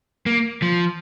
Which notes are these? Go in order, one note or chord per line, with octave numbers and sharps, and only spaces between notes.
A#3
F3